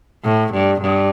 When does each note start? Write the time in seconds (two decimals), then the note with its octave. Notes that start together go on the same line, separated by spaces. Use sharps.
0.25 A2
0.53 G2
0.81 G2